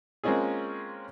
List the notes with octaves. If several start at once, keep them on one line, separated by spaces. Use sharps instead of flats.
G#3 A#3 C4 C#4 F4 G#4